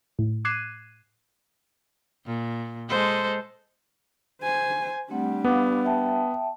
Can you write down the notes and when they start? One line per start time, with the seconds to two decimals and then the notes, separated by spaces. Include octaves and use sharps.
0.19 A2
0.45 D6 F#6 G#6 C7 D#7 E7
2.26 A#2
2.89 G#3 A4 C5
4.42 C5 G#5
5.11 G3 A3 C4 D4 F#5
5.44 B3 F5 F#5 D6
5.85 E5 G5 A5